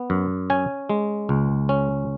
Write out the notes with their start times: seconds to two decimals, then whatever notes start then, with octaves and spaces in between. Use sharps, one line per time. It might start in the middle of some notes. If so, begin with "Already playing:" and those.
Already playing: B3
0.10 F#2
0.50 C#4 G#5
0.89 G#3
1.29 C#2
1.69 C#4